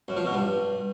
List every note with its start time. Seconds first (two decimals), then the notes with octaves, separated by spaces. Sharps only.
0.08 F#2
0.17 F3
0.25 B2
0.33 G2